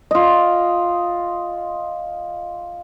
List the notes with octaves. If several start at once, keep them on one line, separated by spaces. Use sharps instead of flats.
F4 D#5